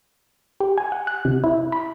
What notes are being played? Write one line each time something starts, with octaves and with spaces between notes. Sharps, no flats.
G4
G#5
F#5
F#6
C3
E4
B5